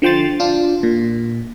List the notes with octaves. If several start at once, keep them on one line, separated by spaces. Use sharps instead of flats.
D3 F3 G5 C6 A6
D4 F4
A#2